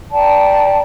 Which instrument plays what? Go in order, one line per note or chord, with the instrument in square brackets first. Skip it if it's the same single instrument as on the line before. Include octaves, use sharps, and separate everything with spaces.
[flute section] D5 G5 A5 A#5